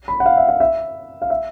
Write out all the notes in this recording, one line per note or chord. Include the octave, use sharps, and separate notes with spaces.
B5
F#5
F5
E5
F5
E5
F5
E5